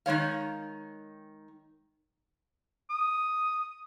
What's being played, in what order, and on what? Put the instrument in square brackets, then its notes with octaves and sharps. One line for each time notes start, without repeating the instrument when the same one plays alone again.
[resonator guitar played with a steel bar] D#3 G#3 C#5 F5
[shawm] D#6